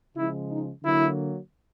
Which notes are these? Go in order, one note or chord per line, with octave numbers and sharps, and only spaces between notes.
C#3 F3 G#3 E4
D#4
D3 F#3 A#3 E4